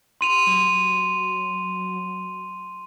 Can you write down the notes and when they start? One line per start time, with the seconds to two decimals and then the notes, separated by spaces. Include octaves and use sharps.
0.21 C6 D#7 F7
0.47 F#3